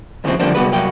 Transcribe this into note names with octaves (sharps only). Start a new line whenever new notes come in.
D#2 C#3 E3 F3 C4
D3 F3 G3 A#3 C4 D4
C3 G3 B3 F#4 G#4 B4
C2 G2 F#3 A#3 B3 G5